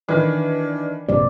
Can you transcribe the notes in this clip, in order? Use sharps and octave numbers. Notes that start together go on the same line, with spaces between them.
D#3 E3 D4
A#1 G2 C3 D5